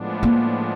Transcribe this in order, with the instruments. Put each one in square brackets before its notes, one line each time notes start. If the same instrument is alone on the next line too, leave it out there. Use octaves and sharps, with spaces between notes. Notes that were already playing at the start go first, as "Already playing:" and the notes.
Already playing: [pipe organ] A2 F3 G#3 B3 D4
[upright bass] A#3